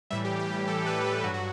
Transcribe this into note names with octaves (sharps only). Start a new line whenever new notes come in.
A2 E3 G3 E5
G4
G4
G4
A2 E3 G3 A4
B4
G4
A4
G2 F#3 F#4
F#4